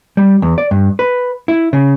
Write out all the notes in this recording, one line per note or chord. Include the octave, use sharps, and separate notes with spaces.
G3
E2
D5
G2
B4
E4
C#3